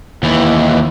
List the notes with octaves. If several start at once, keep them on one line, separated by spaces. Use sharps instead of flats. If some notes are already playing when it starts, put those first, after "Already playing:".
D#2 E3